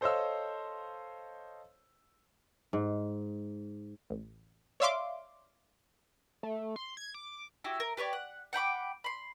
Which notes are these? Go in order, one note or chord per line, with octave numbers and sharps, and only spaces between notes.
A4 C5 C#5 D#5 F5 E6
G#2
A1
C#5 D5 E5 F5 C6 D6
A3
C6
G#6
D6
E4 F#4 G4
A#4
G4 B4 C#5 D5
F#5
F#5 G5 B5 D6
B5 C6